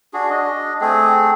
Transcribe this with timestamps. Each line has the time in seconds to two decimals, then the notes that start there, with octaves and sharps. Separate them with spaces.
0.13 D4 F#4 G#4
0.30 D4 D#5
0.81 A3 C4 G#4